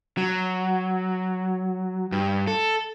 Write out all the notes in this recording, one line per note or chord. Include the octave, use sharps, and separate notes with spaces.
F#3
G2
A4